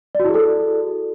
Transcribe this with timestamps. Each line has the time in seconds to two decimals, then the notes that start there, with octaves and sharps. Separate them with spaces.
0.15 D5
0.20 F#4
0.24 E4
0.29 G#4
0.34 A4